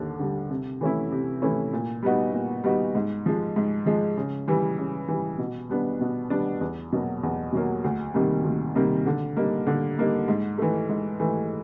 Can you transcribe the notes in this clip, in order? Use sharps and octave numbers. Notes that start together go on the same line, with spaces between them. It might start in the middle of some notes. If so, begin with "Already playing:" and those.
Already playing: D#2 D3
D3 G3
C3
E3 A3 C#4 E4
C3
E3 A3 C#4 E4
A#2
G3 B3 D#4 F#4
A#2
G3 B3 D#4 F#4
G#2
F3 G#3
G#2
F3 G#3
C#3
E3 G3
C#3
E3 G3
B2
G3 B3 D4
B2
G3 B3 D4
E2
B2 F#3 A#3
E2
B2 F#3 A#3
D2
C3 D#3 G3 A#3
D2
C3 D#3 G3 A#3
D3
G3 A#3 D#4
D3
G3 A#3 D#4
G#2
E3 A3
G#2
E3 A3